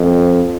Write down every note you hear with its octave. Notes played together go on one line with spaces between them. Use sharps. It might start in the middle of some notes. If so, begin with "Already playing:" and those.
Already playing: F2